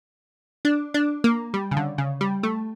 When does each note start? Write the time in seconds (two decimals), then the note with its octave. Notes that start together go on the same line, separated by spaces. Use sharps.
0.65 D4
0.94 D4
1.24 A#3
1.54 G3
1.71 C#3
1.77 D3
1.98 C#3
2.21 G3
2.43 A3